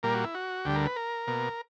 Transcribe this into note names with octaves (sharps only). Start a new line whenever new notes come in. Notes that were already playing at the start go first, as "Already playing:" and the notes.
A#2 G3 A#3 A#4
F#4
E4
F#4
D2 D3 G3 G4
A#4
B4
A#4
B2 A#3